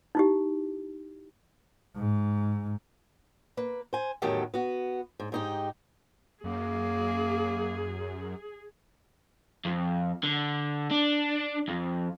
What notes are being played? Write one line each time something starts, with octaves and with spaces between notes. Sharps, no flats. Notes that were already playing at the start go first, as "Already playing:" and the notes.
D#4 E4 G4
G#2
A#3 B4
C5 G#5
E2 A2 D#3 F#3 G4 A4
B3 F#4
G#2
G#2 D#4 G4
F#2 A#3 G#4
F2
D3
D4
F2